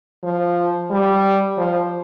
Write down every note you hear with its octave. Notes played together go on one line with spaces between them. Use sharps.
F3
G3
F3